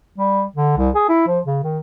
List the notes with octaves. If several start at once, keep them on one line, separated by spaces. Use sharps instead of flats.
G3
D3
C2
G#4
E4
F3
C#3
D#3